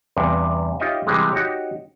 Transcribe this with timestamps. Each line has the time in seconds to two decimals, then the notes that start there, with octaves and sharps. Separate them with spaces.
0.17 E2 G2 C3
0.80 D#4 F4 G4 C#5 D#5 E5
1.07 C3 E3 G3 G#3
1.33 D#4 F#4 G4 C#5